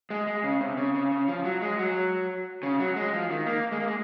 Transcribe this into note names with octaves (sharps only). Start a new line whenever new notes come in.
G#3
G#3
C#3
C3
C#3
C#3
C#3
F3
F#3
G#3
F#3
C#3
F#3
G#3
F3
D#3
A#3
G#3
A#3
G#3